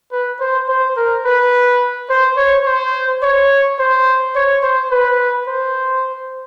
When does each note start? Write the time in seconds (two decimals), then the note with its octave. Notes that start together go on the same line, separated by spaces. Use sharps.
0.12 B4
0.40 C5
0.68 C5
0.97 A#4
1.25 B4
2.09 C5
2.37 C#5
2.66 C5
3.23 C#5
3.79 C5
4.35 C#5
4.63 C5
4.91 B4
5.47 C5